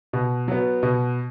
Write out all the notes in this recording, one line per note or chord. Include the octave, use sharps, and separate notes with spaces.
B2
F#3 B3
B2